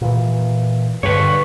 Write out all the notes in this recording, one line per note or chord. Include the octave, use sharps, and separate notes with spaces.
A#2 E3
G2 D3 B4 C#5